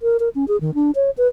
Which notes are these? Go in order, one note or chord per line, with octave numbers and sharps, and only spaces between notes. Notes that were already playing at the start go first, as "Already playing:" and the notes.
A#4
A#4
C#4
G#4
D#3
D4
C#5
B4